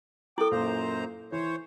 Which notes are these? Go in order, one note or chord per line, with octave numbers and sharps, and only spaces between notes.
E4 A4 G5 D6
F#2 A#2 C5 A#5
E3 C5 C#5